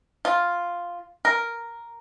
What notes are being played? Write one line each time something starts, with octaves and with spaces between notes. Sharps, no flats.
F4
A#4